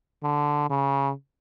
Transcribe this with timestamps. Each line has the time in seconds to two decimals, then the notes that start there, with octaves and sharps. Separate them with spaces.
0.23 D3
0.70 C#3